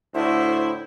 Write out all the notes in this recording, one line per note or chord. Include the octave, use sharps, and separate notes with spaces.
D2 A2 E4 C5